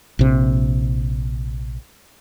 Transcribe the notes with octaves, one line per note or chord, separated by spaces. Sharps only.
A#1 C3